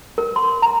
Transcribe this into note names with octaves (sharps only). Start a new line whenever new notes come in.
A#4
C6
A#5